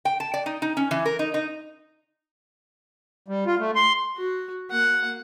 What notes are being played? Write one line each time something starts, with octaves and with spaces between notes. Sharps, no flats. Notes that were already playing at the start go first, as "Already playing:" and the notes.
G5
A5
D5
D#4
D#4
C#4
E3
A#4
D#4
D#4
G3
F4
A3
C6
F#4
A#3 F#5